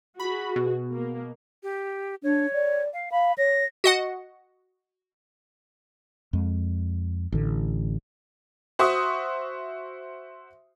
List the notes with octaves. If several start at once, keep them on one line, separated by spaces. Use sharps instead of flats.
F#4 G#4 B5
B2
A#3
G4
D4 C#5
D5
F5
F5 B5
C#5 A#6
F#4 D#5 F#5
F2 G#3
A1 D3
F#4 C5 E5 C#6 D#6